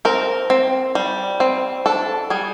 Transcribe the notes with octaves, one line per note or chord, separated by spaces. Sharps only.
C4 A#4
C4
G3
C4
D4 A4
G3 G#4